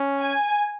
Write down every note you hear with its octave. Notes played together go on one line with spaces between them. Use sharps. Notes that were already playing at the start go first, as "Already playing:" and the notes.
Already playing: C#4
G#5